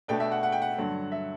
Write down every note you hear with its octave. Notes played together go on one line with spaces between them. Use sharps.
B2 A3 D4 G5
E5
F#5
F#5
G5
F#5
G2 D3 F#3
E5